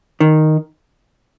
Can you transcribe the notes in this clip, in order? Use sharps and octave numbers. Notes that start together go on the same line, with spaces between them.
D#3